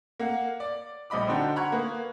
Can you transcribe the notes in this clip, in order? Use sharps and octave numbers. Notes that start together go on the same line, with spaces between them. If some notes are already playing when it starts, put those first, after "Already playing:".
A#3 F5 F#5
D5
A#1 G3 D#5 B5 D6
D3 D4 D#4 F#4 C5 G5
F#5 A#5 B5 C#6 F#6 G#6
A#3 B3